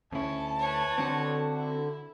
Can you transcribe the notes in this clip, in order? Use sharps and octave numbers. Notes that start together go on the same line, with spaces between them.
D2 C#4 E4 A5
B4 C#5
D3 C4 F#4
E4